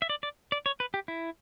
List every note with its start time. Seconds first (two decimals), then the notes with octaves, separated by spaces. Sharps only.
0.02 E5
0.10 D5
0.23 D5
0.52 D5
0.66 C#5
0.80 B4
0.94 G4
1.08 E4